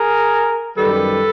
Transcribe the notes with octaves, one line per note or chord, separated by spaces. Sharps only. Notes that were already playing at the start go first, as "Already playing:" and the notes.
Already playing: G#4 A#4
F#2 D#3 G3 A4 B4